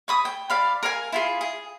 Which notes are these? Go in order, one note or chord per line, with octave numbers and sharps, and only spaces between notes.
C#5 B5 D#6
G5
D5 F5 B5
A#4 F5 G#5
E4 F4 G#4
G#4